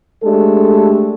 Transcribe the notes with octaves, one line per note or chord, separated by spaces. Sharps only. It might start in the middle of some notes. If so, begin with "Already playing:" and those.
G#3 A3 D4 G4 A4